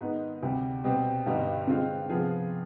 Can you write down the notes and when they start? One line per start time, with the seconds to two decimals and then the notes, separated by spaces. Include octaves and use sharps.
0.01 G#2 D#3 B3 D#4
0.42 D2 C3 G3
0.84 B2 G3 C4
1.26 G2 D3 G3 B3 D#4
1.67 D3 G#3 C4 F4
2.10 C3 F3 B3 F4 G#4